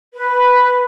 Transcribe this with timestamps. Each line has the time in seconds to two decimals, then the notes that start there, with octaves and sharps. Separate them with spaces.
0.14 B4